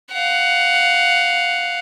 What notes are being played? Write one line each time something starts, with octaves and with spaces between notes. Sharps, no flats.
F5 F#5